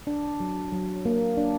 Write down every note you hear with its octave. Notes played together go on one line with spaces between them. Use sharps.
D4
F#3
F#3
A#3
D4